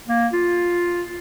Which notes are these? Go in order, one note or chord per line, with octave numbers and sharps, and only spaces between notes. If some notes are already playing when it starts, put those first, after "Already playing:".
A#3
F4